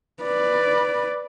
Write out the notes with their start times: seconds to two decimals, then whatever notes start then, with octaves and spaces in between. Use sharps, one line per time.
0.23 B4 D5